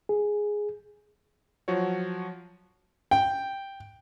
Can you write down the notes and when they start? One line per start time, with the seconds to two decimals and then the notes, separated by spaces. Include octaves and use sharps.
0.09 G#4
1.68 F3 F#3 F#4 C#5
3.11 G5